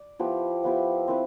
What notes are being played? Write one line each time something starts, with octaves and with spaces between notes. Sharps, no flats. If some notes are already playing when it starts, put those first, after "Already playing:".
Already playing: D5
F3 B3 E4 G4
F3 B3 E4 G4
C4 E4 B4